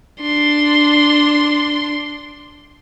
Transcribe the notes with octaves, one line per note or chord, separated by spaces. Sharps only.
D4 C6